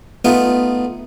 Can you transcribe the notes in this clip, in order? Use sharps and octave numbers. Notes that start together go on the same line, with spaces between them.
A3 B3 D#4 F4